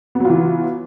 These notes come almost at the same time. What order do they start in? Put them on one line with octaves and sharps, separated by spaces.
B3 F#3 F4 E3